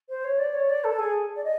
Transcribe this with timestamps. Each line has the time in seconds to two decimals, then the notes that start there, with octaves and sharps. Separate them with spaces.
0.09 C5
0.24 C#5
0.39 D5
0.54 C#5
0.69 D5
0.84 A4
0.99 G#4
1.36 D5
1.44 D#5